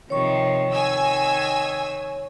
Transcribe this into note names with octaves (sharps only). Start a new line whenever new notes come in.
C3 D#3 F3 C#5 C#6
D#3 G#5 E6